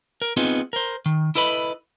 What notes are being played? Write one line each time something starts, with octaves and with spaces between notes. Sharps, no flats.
A#4
B3 C4 D#4 F4 G#4
A#4 C5
D#3
E4 A4 B4 D#5 B5